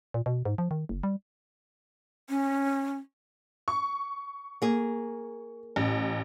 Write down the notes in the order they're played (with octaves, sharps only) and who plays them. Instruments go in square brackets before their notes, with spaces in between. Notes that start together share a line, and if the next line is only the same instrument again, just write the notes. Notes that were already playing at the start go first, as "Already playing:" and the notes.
[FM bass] A#2
B2
G#2
F3
D#3
F#1
G3
[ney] C#4
[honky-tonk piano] C#6
[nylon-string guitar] A#3 G#4
[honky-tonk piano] A1